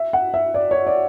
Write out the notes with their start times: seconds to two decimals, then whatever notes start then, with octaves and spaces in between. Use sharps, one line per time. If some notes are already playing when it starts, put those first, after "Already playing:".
Already playing: E5
0.13 F#5
0.34 E5
0.54 D5
0.71 C#5
0.87 D5